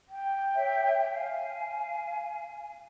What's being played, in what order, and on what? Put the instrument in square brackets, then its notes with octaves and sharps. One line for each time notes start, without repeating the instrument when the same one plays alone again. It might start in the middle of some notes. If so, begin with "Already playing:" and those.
[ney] G5
[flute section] C#5 E5
[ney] F5 [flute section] G#5